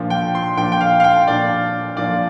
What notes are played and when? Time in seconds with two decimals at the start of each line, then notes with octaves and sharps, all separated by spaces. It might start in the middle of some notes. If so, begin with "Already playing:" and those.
Already playing: A#2 F3 D4
0.10 G5
0.35 C6
0.57 A#2 F3 D4 G5
0.72 G5
0.81 F5
1.00 F5
1.04 G5
1.27 A#2 F3 D4 D5
1.96 A#2 F3 D4 D5